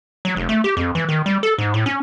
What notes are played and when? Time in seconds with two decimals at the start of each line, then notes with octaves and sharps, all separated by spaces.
0.25 F#3
0.36 F1
0.49 A3
0.64 G4
0.77 F2
0.95 E3
1.09 D#3
1.26 G3
1.43 A4
1.58 G#2
1.74 A2
1.86 C#4